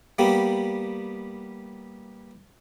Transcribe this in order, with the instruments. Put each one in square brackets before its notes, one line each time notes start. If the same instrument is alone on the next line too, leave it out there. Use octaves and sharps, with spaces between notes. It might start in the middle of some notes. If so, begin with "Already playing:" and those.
[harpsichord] G3 A#3 B3 G4